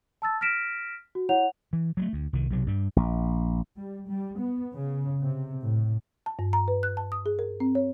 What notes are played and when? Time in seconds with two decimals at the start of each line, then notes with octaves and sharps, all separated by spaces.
0.22 A5 E6 A6
0.41 F6 A#6 B6 D7 E7
1.15 F#4
1.29 E4 C#5 F#5 F7
1.73 E3
1.97 F#3 G3 A3
2.13 D2
2.33 C2 D#3
2.50 B1 C3 F#3
2.67 G2 G3
2.96 A#1
3.77 G3
4.08 G3
4.40 B3
4.75 C#3
5.20 C3
5.64 A2
6.26 A5
6.39 G2
6.53 A#5
6.68 B4
6.83 F#6
6.97 A5
7.12 D#6
7.26 G#4
7.39 A#4
7.60 C4
7.75 C#5